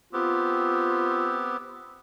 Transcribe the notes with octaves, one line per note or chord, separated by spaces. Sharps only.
B3 C4 F4 G4